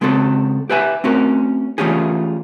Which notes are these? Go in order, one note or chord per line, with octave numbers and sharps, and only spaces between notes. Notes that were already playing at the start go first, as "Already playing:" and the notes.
C#3 G#3 C4 F#4 A4
G4 B4 E5 G#5
A3 C4 C#4 F#4 A#4
E3 A3 C#4 F4 G4 G#4